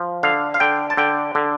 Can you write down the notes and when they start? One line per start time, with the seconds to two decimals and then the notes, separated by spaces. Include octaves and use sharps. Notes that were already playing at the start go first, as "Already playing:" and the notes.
Already playing: F3
0.23 D3 F5
0.54 F5
0.60 D3 G5
0.90 A5
0.97 D3 G5
1.35 D3